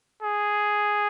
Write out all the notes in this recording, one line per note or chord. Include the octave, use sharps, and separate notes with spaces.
G#4